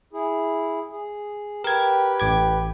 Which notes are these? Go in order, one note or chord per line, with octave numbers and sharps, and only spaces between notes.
E4 G#4
G#4
G4 A#4 B4 G5 G#6
A1 D6 G#6